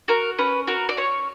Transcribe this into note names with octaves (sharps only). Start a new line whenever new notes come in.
F#4 A#4
C#4 B4
F#4 A#4
D5
C#4 C#5